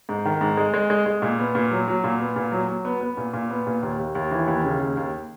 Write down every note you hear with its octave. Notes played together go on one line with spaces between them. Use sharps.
G#2
D#3
G#2
G#3
G#3
G#3
G#3
A#2
B3
A#2
F#3
F#3
A#2
B3
A#2
F#3
F#3
B3
B3
A#2
A#2
B3
A#2
D#2
D#2
D#2
E3
D#2
C#3
D#2
D#2